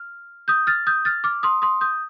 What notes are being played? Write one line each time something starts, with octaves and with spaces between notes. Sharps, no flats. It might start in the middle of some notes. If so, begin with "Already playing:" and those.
Already playing: F6
D#6 G6
F6 A6
D#6 G6
F6 A6
D6 F6
C6 D#6
C6 D#6
D#6 G6